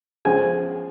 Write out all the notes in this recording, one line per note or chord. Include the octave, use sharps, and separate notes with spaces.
C#3 F3 G#3 G#5